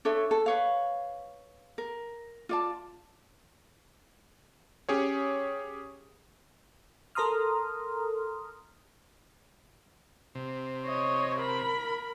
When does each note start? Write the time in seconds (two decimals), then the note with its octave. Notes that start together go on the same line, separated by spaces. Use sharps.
0.05 D4 A4 C#5 E5
0.31 A4
0.46 B4 C#5 F5
1.78 A#4
2.49 F4 D5 A5
4.89 C#4 G4 G#4 C#5
7.15 A4 A#4 A#5 C6 D#6 F6
10.35 C3
10.85 C#5 D#5
11.39 A#4 B5